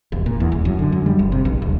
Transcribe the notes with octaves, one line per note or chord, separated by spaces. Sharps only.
E1
A#2
E2
D#1
F#2
D3
F#2
G3
F#1
C3
A#1
D#1